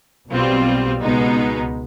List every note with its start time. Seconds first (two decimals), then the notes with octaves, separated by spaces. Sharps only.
0.32 B1 B2 G3 C4 F4
1.02 C#2 B2 G#3 B3 D#4